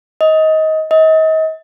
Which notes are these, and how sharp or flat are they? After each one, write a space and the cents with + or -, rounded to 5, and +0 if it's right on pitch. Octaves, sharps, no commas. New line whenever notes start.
D#5 +20
D#5 +35